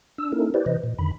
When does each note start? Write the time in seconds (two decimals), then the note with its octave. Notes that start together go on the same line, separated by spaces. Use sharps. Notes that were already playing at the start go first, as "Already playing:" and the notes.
0.18 D4 E6
0.32 A#3 C#4 D#4 E4 A4 A#4
0.54 E4 G4 B4 C5 D5
0.66 C3 E3 B4 C5 D#5
0.84 A#2
0.98 F2 D3 D#3 B5